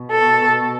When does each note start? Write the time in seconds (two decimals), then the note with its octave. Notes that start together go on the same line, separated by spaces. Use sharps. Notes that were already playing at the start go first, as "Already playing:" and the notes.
Already playing: B2
0.12 A4